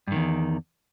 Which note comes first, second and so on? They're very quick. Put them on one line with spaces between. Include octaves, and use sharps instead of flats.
G2 D#3 E2